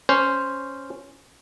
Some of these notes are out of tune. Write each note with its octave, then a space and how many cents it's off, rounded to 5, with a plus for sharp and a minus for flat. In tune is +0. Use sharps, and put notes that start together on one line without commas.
C#4 +0 C5 +0